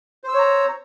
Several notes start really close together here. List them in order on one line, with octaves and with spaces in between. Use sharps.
C5 E6 C#5 A#5